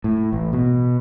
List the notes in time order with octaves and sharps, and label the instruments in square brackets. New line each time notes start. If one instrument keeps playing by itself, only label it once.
[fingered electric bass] A2
A1
B2